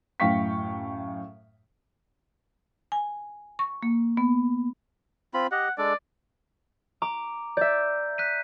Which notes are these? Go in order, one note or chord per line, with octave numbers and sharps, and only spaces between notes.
F#2 A2 F5 G5 C#6 B6
G#5
C#6
A#3
B3
C4 F4 B5
G4 D#5 F#5
G#3 D4 A4 D5
A#5 D6
D5 E5 G6
F#6 B6 D#7